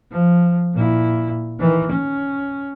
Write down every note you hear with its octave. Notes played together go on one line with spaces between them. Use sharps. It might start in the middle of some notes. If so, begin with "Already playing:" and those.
F3
A#2 E4
D#3 E3
C#4